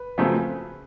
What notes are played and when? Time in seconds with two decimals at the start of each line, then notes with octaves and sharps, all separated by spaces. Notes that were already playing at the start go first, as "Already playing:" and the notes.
Already playing: B4
0.18 F#2 C#3 F3 A3 C4